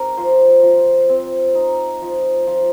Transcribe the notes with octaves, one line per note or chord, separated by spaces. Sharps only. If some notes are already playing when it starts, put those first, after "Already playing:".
Already playing: C4 D#4 G4 A#4
F3 C5
F3
C4
D#4
F3
F3